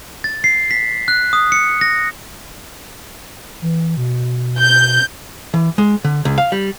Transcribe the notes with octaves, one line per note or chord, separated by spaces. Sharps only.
A6
C7
B6
F#6
D#6
C#7
A#6
E3
B2
G6
E3
G#3
D3
C#2
F5
G3